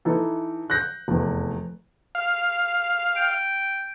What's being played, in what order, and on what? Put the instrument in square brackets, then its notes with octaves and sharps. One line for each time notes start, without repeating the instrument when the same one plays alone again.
[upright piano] E3 D#4 A4
F#6 G6 A#6
F1 E2
[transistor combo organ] F5
[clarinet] G5